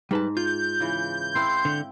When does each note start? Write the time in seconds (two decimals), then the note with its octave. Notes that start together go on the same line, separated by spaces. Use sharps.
0.11 G#2 G3 B4 A5
0.37 F4 G6
0.80 C#3 E3
1.35 C4 E4 F5 C6
1.65 D3